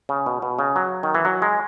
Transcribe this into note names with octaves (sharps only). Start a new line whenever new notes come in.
C#3
B2
B2
C#3
F#3
D#3
E3
F#3
G#3